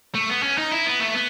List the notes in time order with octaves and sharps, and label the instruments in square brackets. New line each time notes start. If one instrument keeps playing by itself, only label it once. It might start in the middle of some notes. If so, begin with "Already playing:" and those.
[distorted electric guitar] A3
B3
C#4
D#4
E4
B3
A3
B3